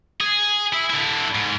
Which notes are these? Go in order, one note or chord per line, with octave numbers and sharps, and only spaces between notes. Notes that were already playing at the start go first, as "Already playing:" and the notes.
G#4
E4
D3 E4
G#2